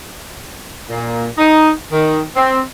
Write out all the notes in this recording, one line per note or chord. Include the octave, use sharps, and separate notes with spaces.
A#2
D#4
D#3
C4